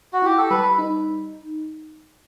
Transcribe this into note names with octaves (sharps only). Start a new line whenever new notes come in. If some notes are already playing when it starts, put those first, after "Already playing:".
F#4
E4 G4
A4
G3 B4
D#4